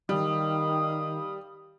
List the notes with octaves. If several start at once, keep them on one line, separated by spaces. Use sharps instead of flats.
D#3 G3 F5 D#6